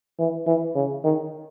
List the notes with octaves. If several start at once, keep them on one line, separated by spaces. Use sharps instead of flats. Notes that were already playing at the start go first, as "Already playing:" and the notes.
E3
E3
C#3
D#3